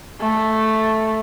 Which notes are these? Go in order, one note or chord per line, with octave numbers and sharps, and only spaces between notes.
A3